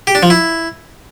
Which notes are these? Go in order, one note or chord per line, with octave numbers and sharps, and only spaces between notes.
G4
D4
F3
E4